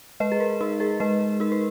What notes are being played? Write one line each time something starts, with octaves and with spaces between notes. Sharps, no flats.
G#3 B4 D#5
G#4
A#4
D#4 A#4
G#4 B4
G#3 B4 D#5
D#4 A#4
B4